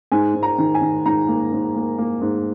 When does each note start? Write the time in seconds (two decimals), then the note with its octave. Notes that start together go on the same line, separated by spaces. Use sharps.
0.12 G#2 G#5
0.34 G#2
0.43 A#5
0.58 D#3
0.75 G#5
0.81 D#3
1.06 G#2 A#5
1.28 A#3
1.52 G#2
1.76 A#3
1.98 A#3
2.21 G#2